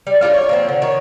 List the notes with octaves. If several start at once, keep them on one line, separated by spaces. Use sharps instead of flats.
G3
G3 D4 F4 G4
C#5
A#2 F3 C4
D3
D#3 C#5